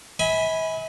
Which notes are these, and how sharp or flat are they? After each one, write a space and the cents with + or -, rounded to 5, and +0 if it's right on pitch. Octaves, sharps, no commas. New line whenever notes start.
E5 -45 G#5 +0 B5 +0